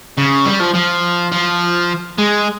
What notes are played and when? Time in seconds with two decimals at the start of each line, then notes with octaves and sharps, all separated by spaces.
0.18 C#3
0.46 G3
0.61 F3
0.75 F3
1.32 F3
2.19 G#3